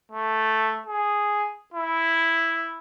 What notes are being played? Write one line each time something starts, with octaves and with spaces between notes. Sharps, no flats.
A3
G#4
E4